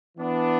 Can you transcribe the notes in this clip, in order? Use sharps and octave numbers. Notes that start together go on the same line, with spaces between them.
E3 B3 D4